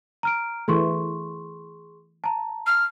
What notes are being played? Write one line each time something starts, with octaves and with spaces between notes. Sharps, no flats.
A#5 F6 D7
E3 A3 G#4 C6 C#6
A5 A#5
F6